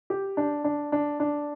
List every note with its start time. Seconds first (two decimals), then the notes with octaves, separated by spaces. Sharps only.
0.10 G4
0.37 D4
0.64 D4
0.92 D4
1.20 D4